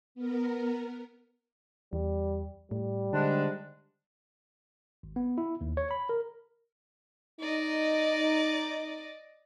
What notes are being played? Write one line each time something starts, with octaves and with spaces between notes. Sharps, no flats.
B3 A#4
E2 G3
A2 G3
G#2 D3 G#3 D4
G#1
B3
E4
D#2
C#5
B5
A#4
D#4 D5 D#5